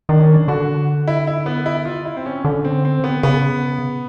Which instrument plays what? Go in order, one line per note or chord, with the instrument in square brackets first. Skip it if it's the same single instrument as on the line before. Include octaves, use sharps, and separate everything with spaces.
[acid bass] D#3 [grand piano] D4
[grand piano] C#4
D4
[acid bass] D3 [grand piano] F#4
[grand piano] E4
E4
B3
E4
F4
E4
C4
C#4
[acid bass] D3 [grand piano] C#4
[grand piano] C4
C4
B3
[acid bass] C#3 [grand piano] B3